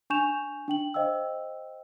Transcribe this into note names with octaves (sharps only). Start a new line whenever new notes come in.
D4 G#5 C#6 G6 E7 F7
D4 G5 F#7
C5 D#5 F5 G5 E6